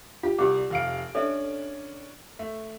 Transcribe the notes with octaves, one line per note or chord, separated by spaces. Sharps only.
F4 G4
C2 G3 G4 D6
F1 F5 D7
C#4 D4 A4 E5
A3